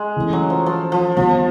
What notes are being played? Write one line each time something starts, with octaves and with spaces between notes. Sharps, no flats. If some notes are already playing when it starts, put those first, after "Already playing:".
Already playing: G#3
E3 A3 C#4
F#3
F3
F3
F3
D#3 F3 G3 B3